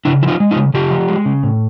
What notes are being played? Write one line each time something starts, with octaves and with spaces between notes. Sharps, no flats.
C#3 D4 E4
F3 E4
D#4 F4
G#3
D#4 F4
C#3
C#3 F4 G4
F3
G#3
C#3
A2